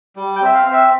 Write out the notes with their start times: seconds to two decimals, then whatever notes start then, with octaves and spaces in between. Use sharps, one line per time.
0.16 G3
0.36 G5
0.42 C4 E5
0.54 F5
0.66 C4
0.73 E5